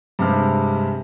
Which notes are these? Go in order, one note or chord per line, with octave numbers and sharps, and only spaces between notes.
G2 C3 G#3 F6